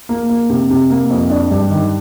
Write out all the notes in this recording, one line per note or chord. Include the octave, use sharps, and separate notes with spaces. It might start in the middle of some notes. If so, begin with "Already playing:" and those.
A#3
A#3
C3
C3
A#3
F2
D4
G2
D#3